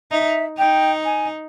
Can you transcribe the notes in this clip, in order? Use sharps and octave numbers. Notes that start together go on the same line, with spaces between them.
D#4 E5
D#4 G5
G#5